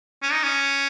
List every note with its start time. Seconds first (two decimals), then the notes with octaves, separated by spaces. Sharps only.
0.23 C#4
0.32 D#4
0.43 C#4